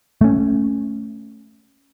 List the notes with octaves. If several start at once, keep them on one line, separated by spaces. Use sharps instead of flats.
A3 C#4